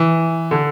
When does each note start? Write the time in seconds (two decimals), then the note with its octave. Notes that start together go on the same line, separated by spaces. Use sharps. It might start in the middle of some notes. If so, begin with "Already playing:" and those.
Already playing: E3
0.51 D3